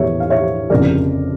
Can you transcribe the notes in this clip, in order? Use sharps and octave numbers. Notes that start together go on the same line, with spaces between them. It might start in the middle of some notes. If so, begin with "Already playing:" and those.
Already playing: E2 E3 A3 C#5 E5
F5
C#5 E5
G1 F2 C#3 A#4 D5